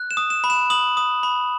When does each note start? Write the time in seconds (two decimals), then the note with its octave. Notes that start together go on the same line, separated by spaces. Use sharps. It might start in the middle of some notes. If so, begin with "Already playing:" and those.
Already playing: F#6
0.11 E7
0.17 D#6
0.30 E7
0.44 B5
0.50 E7
0.70 D#6 F#7
0.97 D#6
1.23 B5